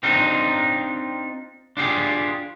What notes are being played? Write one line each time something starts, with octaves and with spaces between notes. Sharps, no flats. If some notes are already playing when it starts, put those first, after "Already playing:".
C4 D4 D#4 F4 A#4
D4 F4 G4 G#4